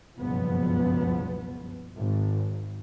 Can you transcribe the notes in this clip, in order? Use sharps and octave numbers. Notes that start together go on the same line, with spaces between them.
F#1 C#2 G2 B2 F3 B3
G#1